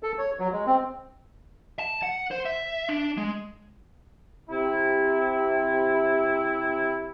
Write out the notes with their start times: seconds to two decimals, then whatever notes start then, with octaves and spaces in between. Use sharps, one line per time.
0.03 A4
0.18 C#5
0.39 F#3
0.52 G#3
0.66 C4
1.79 A5
2.03 F#5
2.31 C5
2.45 E5
2.89 D4
3.17 G#3
4.49 C3 E4